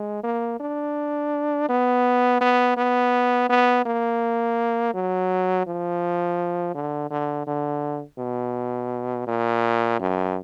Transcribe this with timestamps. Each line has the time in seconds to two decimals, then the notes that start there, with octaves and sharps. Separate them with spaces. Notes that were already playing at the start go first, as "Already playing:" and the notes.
Already playing: G#3
0.24 A#3
0.60 D4
1.69 B3
2.41 B3
2.77 B3
3.50 B3
3.86 A#3
4.94 F#3
5.67 F3
6.75 D3
7.11 D3
7.47 D3
8.19 B2
9.27 A#2
10.00 F#2